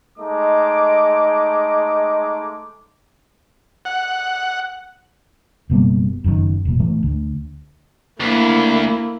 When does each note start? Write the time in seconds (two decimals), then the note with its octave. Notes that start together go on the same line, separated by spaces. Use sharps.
0.18 G#3 A3 D#4 D#5 D6
3.85 F#5
5.70 F#1 B2 G3 A#3
6.24 F#1 F#2 B2 D#3
6.65 E1 A#2
6.79 G#2 E3 A3
7.03 D2
8.20 D2 A#3 E4